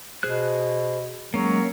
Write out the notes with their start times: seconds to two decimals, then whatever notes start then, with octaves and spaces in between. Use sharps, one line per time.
0.23 B2 G#4 C5 F#6
1.34 F#3 G#3 A#3 C#4